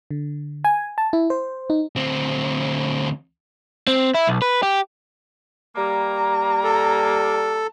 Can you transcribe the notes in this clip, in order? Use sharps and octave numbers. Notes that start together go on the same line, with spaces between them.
D3
G#5
A5
E4
C5
D#4
D2 C4
C4
E4
B1
B4
G4
G3 A#3 A#5
A4